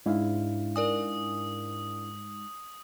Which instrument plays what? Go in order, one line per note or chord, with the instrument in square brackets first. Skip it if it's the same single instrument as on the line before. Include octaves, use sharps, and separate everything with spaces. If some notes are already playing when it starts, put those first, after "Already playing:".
[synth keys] G#2 [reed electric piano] D4 E4 F5
[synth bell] A#4 D5 G#5 [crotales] D#6